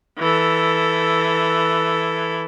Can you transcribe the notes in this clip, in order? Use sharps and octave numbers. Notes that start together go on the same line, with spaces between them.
E3 A4